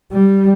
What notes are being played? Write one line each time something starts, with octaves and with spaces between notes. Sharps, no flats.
G3